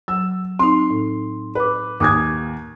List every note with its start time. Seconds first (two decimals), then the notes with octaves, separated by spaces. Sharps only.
0.08 F#3 E6
0.59 C4 D#4 C6
0.91 A2
1.55 B4 B5 D6
2.00 D#2 G#5 D6 D#6 F#6 G#6